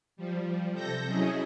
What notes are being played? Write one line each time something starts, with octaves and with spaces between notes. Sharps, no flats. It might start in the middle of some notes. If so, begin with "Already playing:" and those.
F3 G3
C3 A4 G6 A#6
F#3 C#4 E4 G#4 D#5